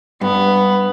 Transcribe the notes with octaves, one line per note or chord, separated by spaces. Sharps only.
G2 B3